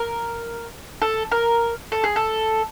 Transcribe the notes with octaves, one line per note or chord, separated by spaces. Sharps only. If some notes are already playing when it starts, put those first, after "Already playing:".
Already playing: A#4
A4
A#4
A4
G#4
A4